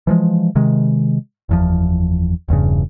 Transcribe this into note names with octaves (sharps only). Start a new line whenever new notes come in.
E3 F3 G#3
C3 D#3 G#3
F#1 E2 F3
E1 E2 G2 C#3